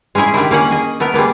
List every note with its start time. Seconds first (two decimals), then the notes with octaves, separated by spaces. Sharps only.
0.15 G#3 C#4 D#4 E4 G#4
0.34 D#3 G3 D4 E4
0.51 A#3 C#4 F#5
0.71 G#4 D#5
1.00 A3 B3 A#4
1.14 G3 G#3 A#3 B3